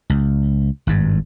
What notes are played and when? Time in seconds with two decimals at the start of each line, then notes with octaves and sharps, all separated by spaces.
0.10 C#2
0.87 G#1 G2